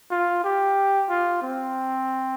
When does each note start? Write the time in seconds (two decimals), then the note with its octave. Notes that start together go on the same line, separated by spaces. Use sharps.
0.11 F4
0.44 G4
1.10 F4
1.42 C4